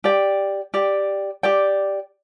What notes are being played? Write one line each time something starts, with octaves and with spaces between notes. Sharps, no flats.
G4 D5 G5
G4 D5 G5
G4 D5 G5